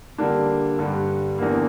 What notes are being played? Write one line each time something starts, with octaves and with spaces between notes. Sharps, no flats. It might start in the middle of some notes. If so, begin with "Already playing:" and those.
D3 G3 A#3 D4
G2 D3 G3
E2 D3 A#3